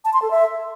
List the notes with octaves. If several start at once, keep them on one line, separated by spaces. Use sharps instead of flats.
A5
C6
A4
E5